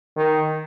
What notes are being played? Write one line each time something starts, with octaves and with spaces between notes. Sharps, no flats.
D#3